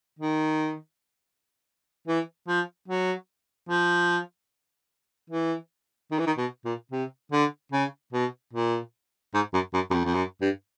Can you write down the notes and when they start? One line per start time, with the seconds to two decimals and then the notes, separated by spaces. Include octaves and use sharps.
0.19 D#3
2.08 E3
2.48 F3
2.88 F#3
3.69 F3
5.30 E3
6.11 D#3
6.19 E3
6.27 D#3
6.38 B2
6.65 A#2
6.91 C3
7.32 D3
7.72 C#3
8.13 B2
8.53 A#2
9.34 G#2
9.53 F#2
9.74 F#2
9.90 F#2
9.94 F2
10.05 F2
10.14 F#2
10.41 G2